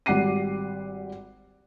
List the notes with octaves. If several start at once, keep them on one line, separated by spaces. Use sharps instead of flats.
G#1 G3 F#5 D6 C7 D#7